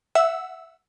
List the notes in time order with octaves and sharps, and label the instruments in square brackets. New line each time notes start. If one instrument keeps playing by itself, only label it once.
[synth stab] E5 F#5 E6